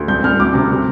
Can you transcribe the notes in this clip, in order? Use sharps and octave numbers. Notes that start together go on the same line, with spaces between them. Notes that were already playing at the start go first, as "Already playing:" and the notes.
Already playing: D2
C2 G6
C2 F6
D2 D6
C3
C3